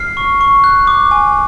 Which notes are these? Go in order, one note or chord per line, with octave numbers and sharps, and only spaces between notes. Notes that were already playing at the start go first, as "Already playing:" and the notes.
Already playing: F6 C7
C#6
C#6
F#6
D6
G#5